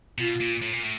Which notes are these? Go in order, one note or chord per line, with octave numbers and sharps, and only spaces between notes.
B2 F4
A#2
A2
A#2
A2